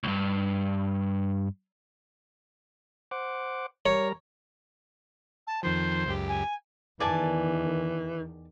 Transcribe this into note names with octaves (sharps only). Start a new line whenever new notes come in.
C#2 G2
C5 F#5 D6
G3 A#4 C#5 A#5
A5
F2 D#3 F3 C5
C#2 F#2 G4
G#5
E2 D#3 E3 D5 G#5 A5